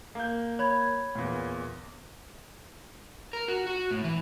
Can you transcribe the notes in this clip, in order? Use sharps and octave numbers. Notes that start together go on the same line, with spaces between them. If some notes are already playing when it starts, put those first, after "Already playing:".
A#3 G6
C#5 B5 G#6
E2 A#2
A#4
F#4
F#4
A2
E3